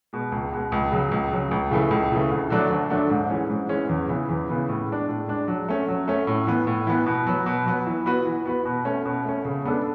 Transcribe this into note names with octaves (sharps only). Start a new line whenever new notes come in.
B2 G#3
C#2
B2 G#3
C#2
C#3 F#3
C#2
C#3 F#3
C#2
C#3 E3 A3
C#2
C#3 E3 A3
D2
D3 F#3 A3 D4
D2
D3 F#3 A3 D4
G#2
E3 G#3 C#4
G#2
E3 G#3 C#4
E2
C#3 E3 B3
E2
C#3 E3 B3
A2
G#3 D4
A2
G#3 D4
F#3
A3 C#4
F#3
A3 C#4
A2
E3 B3
A2
E3 B3
B2
F#3 B3
B2
F#3 B3
E3
B3 F#4 B4
E3
B3 F#4 B4
B2
A3 C#4
B2
A3 C#4
C#3
G#3 B3 D4 A4